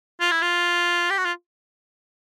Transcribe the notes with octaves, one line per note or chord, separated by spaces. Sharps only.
F4
E4
F4
G4
F#4
F4